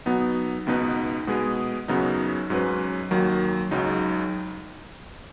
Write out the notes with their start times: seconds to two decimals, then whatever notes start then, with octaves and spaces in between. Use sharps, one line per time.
0.06 B2 F#3 B3 D#4
0.67 C#2 B2 B3 D#4 B4
1.27 B2 G#3 B3 G#4
1.88 F#2 C#3 F#3 B3 D#4
2.50 G#2 F#3 C#4 B4
3.11 D#2 D#3 F#3
3.71 C#2 C#3 F#3 D#4